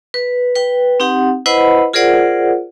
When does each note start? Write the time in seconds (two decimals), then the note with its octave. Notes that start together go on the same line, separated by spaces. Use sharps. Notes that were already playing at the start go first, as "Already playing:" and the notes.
0.14 B4
0.56 B4 G5
1.00 C4 D#4 G4 F#5
1.46 E4 B4 C5 D#5 F#5 B5
1.93 F4 G#4 A#4 C5 D5 F#5